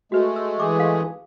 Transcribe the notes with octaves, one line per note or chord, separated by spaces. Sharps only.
G#3 A3 F#4 B4
E6
E3 G#4 D6
F5